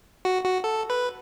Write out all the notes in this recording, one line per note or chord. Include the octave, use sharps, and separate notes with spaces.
F#4
F#4
A4
B4